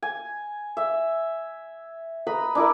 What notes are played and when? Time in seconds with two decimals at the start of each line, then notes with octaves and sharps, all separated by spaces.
0.02 G#5
0.77 E5
2.27 B4 D#5 A#5 B5
2.55 D4 E4 A#4